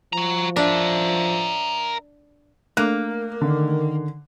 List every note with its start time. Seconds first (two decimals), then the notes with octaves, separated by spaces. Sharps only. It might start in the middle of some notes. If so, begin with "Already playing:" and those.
0.13 F3 F#4 A#5
0.56 D4 A#4 E5
2.77 A3 A#3 D4 A#4 F#6
3.41 D3 D#3